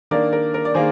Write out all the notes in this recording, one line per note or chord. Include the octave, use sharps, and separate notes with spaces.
D#3 A#3 D4 A#4 D5
A#4
A#4
D5
D#3 A#3 G#4 C5